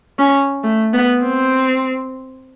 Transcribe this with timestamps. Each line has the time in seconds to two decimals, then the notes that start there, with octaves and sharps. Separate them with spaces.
0.19 C#4
0.63 A3
0.93 B3
1.23 C4